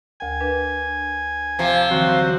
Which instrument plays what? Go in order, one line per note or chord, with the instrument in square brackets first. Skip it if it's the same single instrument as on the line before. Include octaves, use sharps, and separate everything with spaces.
[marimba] D2 A#4 G5 [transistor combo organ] G#5
[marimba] D4 A#4 B4
[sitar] C3 F3
[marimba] D3 E3 [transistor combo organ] F#3 C4 F#4